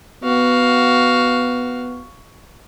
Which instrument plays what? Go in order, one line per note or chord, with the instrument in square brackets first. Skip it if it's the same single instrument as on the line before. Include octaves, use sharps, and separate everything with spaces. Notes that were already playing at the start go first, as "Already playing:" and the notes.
[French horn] B3 [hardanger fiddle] F#4 F5